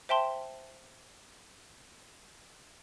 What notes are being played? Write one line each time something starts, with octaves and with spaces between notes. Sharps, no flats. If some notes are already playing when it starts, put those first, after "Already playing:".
C5 E5 G5 A5 C6